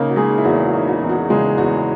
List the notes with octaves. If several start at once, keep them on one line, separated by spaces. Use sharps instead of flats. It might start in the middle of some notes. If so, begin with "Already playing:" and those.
Already playing: C#3 A#3 D#4 A#4
F#4
G#3 D#4 G#4
E4
E2 F#4
F#4
D#4
F#4
E2
F#4
C#3 G#3 G#4
E2 F#4